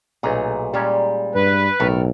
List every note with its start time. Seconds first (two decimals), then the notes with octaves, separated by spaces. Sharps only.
0.23 B1 A#2 A3 D#4 G#4
0.74 A#2 G3 G#3 C#4 A5
1.35 G2 B4
1.80 B1 A2 A4 A#4